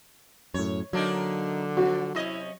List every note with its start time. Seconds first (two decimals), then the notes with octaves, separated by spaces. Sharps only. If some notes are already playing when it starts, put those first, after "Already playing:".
0.54 F#2 A2 C#5
0.93 D3 F#3 A#3 D4 D#4
1.77 F3 F#4
2.15 C3 C#4 E4 D#5